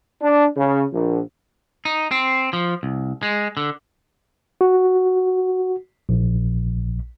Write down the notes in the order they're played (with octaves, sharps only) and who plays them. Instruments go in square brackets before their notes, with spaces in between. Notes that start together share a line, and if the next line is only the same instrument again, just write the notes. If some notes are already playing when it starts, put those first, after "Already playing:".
[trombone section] D4
C#3
A#1
[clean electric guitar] D#4
C4
F3
C2
G#3
D3
[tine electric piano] F#4
A#1